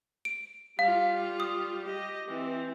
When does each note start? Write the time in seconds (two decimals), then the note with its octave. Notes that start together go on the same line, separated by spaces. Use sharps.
0.25 D7
0.79 G3 F4 F5
1.40 D#6
1.85 G4 D#5
2.30 E3 C4